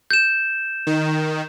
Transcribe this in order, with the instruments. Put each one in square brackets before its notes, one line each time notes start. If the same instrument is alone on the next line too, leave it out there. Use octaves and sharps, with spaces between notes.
[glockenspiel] G6 E7
[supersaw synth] D#3